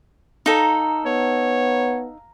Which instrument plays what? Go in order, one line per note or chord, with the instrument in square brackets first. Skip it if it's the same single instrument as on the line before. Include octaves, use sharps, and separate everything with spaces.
[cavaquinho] D#4 A4 [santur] F5 A#5
[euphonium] B3 [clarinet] C#5